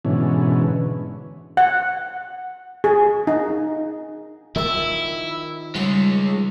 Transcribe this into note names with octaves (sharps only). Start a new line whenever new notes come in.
G#2 B2 D3 E3 C#4
F#5
G#4
D#4
D#3 F3 E4 A#4 E6
C#3 G3 G#3 F7